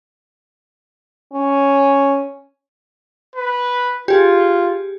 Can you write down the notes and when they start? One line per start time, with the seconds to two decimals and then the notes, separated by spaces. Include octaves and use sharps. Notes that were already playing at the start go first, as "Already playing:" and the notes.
1.32 C#4
3.36 B4
4.08 F4 G4 G#4